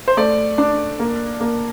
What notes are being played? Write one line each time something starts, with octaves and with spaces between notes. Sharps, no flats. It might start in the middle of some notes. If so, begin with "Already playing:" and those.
C5
A3 D5
D4
A#3
A#3